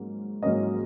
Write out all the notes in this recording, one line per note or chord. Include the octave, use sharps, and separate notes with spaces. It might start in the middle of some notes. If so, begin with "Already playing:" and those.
Already playing: G#2 F#3 A#3 C#4
G#2 F#3 A#3 C#4 D#5